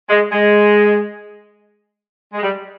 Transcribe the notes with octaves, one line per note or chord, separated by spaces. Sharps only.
G#3
G#3
G#3
G3